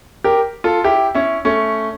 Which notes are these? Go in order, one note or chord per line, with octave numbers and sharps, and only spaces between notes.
G4 A#4
F4 A4
E4 G4
C#4 E4
A3 C#4